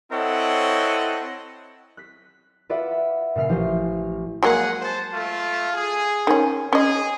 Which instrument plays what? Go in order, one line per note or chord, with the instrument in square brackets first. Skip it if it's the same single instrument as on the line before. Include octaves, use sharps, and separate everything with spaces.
[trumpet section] C4 E4 A4 C#5 D#5 F#5
[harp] F#6 B6
F4 B4 D5 E5 F#5 B5
B5
A#2 C#3 E5 F6 C7
A1 F3 C5
[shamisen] F#3 G#3 A#3 [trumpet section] G#4 F#5
[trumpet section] C5 A5
A3 F4
G#4
[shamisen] D#3 C#4
[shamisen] C#4 D#5 [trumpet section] G#4